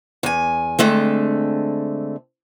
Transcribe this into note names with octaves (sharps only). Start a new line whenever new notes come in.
E2 G#5
D3 G#3 A3 C4